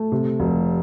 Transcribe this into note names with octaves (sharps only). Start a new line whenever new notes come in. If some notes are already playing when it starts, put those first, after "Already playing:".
Already playing: A3
C3
F1